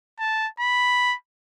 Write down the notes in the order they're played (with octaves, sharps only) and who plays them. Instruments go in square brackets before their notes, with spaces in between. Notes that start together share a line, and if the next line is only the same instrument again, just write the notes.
[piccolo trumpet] A5
B5